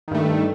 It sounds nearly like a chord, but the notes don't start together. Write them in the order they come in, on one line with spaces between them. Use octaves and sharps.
D#3 G2 A3